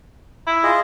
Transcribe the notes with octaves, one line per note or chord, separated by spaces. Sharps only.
E4
F4 G#4 D#5